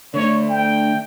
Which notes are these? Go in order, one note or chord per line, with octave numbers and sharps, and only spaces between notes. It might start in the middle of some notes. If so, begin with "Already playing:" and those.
D3 A3 D4 C#5
G5